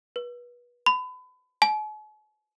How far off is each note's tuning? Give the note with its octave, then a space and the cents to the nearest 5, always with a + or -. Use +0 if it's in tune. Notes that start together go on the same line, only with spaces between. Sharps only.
B4 -30
B5 +30
G#5 +45